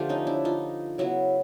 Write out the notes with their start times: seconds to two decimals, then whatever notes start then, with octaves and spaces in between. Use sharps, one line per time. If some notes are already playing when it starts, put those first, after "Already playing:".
Already playing: D3 F3 A3 F4 G4
0.09 C#4 D#4
0.27 D4 E4
0.45 D#4 F4
0.98 C#3 F#3 B3 E4 F#4